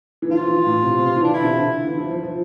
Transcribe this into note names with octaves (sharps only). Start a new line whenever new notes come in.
E3
F3 F4
E3
A2
C3
C3
E3
D4
D3 E4
C3
D3
E3
F3
F3
F3